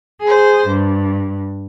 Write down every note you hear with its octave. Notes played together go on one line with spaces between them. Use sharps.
G#4 C5
G2